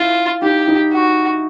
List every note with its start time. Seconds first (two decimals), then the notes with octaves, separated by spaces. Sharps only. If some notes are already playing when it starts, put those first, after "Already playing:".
Already playing: E4 F4
0.42 D#4 G4
0.68 D#4
0.92 F#4